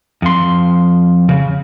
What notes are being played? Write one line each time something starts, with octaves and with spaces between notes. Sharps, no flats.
F2 C6
C#3